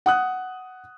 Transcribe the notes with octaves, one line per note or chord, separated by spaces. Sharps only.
F#5 D#6 F#6